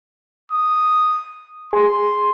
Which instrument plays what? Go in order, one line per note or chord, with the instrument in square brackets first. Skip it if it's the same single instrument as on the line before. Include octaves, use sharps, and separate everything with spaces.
[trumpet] D#6
[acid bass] G#4 [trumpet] C6